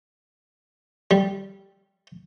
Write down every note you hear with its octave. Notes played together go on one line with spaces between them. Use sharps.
G3